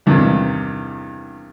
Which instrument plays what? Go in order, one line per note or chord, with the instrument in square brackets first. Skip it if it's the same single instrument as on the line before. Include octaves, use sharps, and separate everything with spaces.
[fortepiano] E2 G2 C3 D#3